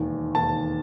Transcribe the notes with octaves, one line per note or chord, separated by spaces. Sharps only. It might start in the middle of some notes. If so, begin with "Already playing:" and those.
Already playing: E1 D#2 D#3
E1 D#2 D#3 A5